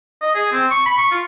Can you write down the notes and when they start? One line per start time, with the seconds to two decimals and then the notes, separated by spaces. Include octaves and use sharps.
0.22 D#5
0.35 G#4
0.52 C4
0.71 C#6
0.86 B5
0.98 C#6
1.11 F4